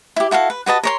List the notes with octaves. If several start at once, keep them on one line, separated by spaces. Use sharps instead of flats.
E4 G4
E4 F#4 A4 F5
B4
F#4 B4 D#5 A5
A#4 C#5 C6